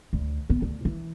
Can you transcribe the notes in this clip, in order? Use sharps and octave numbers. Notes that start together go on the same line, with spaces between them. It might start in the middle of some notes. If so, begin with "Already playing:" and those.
D2
B3
D2
E3